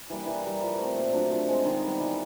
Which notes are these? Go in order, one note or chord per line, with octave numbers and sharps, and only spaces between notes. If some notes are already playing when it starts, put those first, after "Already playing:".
E3 G3 A#3
E3
G3 A#3
F3
A3 C4
A#2
F#3 A3 D4
F3
G#3 C4
D#3
G3 B3
E3